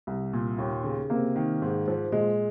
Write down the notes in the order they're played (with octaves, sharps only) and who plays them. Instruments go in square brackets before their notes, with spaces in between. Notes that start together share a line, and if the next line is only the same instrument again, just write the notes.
[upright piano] C2
A#2
D#2
C#3
[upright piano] C3 [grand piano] A#3
[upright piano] D#3
G#2
F3
[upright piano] A#2 [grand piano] G#3